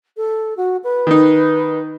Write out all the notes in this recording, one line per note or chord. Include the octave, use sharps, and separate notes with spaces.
A4
F#4
B4
D#3 D#4